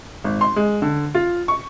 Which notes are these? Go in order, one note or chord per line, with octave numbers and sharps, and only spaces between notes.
G#1
C6
G#3
D3
F4
C#6